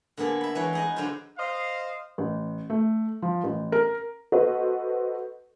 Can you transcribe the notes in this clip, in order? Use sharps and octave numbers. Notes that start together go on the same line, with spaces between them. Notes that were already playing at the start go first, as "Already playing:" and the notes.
D3 A#3 B3 G#4 A4
E5 B5
E3 G#3 B4 C#5
D#4 G#4 D#5
D3 F#3 D#4 F4 C5
C5 D#5 F5
A1
A3
F3
A1
A#4
F#4 A4 B4 C5 D#5